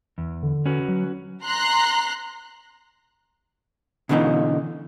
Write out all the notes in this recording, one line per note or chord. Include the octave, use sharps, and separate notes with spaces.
E2
D3
C#4 F#4 B4
F#3
A#5 C6 F#6
B2 D3 E3 C#4 D#4